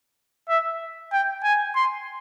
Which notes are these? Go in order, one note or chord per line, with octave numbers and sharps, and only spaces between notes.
E5
G5
G#5
C6